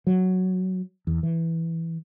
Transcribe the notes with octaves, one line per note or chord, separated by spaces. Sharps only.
F#3
E2
E3